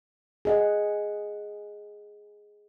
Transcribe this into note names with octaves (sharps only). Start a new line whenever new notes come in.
G#4 D#5 F#5